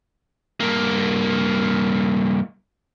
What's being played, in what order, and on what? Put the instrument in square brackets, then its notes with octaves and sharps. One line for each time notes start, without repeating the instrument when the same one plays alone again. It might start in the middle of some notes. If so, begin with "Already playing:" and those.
[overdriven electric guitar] G2 A#3